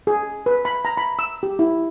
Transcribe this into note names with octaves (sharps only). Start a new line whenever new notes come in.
G#4
B4
B5
A#5
B5
E6
G4
E4